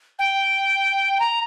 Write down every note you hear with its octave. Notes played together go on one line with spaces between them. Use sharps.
G5
A#5